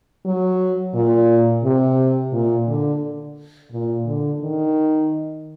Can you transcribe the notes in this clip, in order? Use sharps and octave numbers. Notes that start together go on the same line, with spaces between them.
F#3
A#2
C3
A#2
D3
A#2
D3
D#3